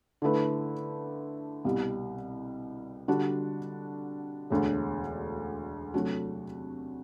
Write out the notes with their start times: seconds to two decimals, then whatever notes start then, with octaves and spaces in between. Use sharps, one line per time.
0.22 D3 A3 E4 B4
1.65 C2 B2 G3
3.08 D3 G3 D4 F#4
4.50 E1 D2 D3
5.94 C3 F#3 A3 D4 F#4